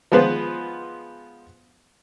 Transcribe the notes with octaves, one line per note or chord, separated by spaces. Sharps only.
F3 G#3 B3 F4 B4 C5